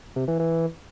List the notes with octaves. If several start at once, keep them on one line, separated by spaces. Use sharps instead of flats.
C3
E3
E3